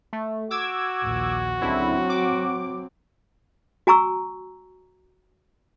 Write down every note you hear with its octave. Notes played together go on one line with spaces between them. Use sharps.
A3
F#4 D6 E6 G#6
A#1 D#2
C#2 D3 F#3 C4 E4
D6
F#4 G#5 A#5 C#6 E6